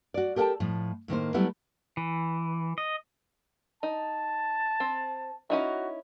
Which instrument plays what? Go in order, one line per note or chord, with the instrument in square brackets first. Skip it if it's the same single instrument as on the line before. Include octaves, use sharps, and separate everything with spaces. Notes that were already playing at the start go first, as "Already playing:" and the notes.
[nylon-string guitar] F#4 D5
G4 A4 A#4 F#5 G5 A5
A2 F3
A2 D#3 A#3 C5
F#3 G3 A3 B3 E4
[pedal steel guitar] E3
D#5
[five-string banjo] D#4 [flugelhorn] A5
[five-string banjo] C4
[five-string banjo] C#4 D#4 E4 [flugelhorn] F#4